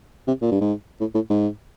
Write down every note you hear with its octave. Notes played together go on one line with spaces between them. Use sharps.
C3
A#2
G2
G#2
A2
A2
G#2